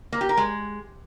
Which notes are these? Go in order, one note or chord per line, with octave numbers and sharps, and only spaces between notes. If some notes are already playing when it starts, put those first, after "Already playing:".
A#3
G4
A#4
G#3